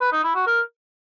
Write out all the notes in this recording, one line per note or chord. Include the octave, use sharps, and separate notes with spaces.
B4
D#4
E4
F#4
A#4